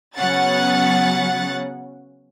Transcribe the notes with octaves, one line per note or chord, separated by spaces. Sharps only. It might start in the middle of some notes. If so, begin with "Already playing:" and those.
C#3 F#3 B3 C#4 F#5 A6